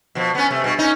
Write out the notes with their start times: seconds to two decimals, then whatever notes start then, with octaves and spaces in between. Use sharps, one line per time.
0.15 B2 F3
0.35 B3 C#4
0.51 C3 A3
0.64 G2 B2
0.79 C#4 D#4